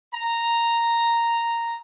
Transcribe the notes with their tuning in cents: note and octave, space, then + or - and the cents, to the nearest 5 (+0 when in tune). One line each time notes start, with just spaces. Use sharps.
A#5 -5